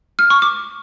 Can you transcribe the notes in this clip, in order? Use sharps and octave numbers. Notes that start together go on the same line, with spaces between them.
F6
C#6
D6